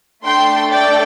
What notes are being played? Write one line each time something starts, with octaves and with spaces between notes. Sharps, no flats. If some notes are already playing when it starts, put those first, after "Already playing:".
A3 D4 A4 G5 C6
D5 G5